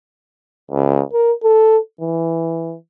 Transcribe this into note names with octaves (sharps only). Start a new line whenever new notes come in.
C#2
A#4
A4
E3